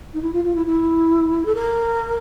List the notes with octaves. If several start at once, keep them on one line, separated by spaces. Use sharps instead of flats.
D#4
E4
F4
F4
E4
E4
A4
A#4